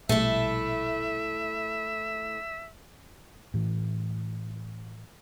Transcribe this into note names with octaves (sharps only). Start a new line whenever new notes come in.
A#1 B2 G3 A3 E4 E5
A2 E3